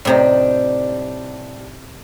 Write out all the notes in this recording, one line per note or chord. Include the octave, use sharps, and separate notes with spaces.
A2 C3 G3 D4 D#4